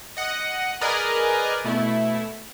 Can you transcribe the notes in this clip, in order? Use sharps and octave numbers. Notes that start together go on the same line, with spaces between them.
D#5 F#5
G#4 A#4 B4 D5 D#5 G#5
B2 A3 E4